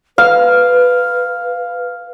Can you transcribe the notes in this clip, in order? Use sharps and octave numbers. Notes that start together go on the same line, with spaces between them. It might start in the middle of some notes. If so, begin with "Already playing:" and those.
B4 F5